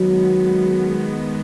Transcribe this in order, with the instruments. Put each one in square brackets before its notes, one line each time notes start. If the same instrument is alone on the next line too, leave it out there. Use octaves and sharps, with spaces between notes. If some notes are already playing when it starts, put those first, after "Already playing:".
Already playing: [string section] D#3 G#3 B3 [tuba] F#3